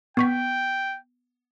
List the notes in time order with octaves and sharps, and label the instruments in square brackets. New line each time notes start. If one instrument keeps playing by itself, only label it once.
[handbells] B3 C#6 B6 [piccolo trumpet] G5